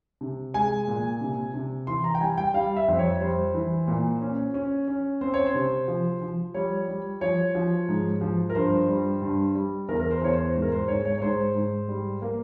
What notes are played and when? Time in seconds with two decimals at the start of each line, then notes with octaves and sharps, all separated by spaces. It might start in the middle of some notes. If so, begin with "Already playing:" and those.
0.21 C3
0.54 G#3 G#5
0.88 A#2
1.21 C3
1.54 C3
1.87 E3 C6
2.04 A#5
2.15 G5
2.21 G3 G#5
2.38 G5
2.54 G3 F5
2.76 E5
2.88 F2 C5
2.99 C#5
3.21 G3 C5
3.54 E3
3.87 A#2
4.21 C#4
4.54 C#4
4.88 C#4
5.21 C4 C5
5.34 C#5
5.46 C5
5.54 C3
5.88 F3
6.21 F3
6.54 G3 C#5
6.88 G3
7.21 F3 C#5
7.55 F3
7.88 G#2
8.21 F3
8.50 A#4
8.55 G2 C5
8.88 G3
9.22 G2
9.55 G3
9.88 E2 A#4
10.00 A#4
10.11 C5
10.21 E2 C#5
10.33 C5
10.55 G#2
10.62 A#4
10.72 C5
10.88 G#2 C#5
11.05 C#5
11.18 C#5
11.22 G#2 C5
11.55 G#2
11.88 G3
12.22 A#3